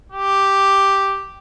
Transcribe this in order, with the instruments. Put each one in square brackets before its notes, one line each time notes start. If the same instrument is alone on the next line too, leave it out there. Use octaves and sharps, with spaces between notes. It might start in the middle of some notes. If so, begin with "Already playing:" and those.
[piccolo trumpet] G4